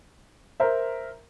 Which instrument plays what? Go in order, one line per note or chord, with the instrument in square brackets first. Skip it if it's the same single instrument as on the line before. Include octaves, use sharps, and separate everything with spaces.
[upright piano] A#4 C5 E5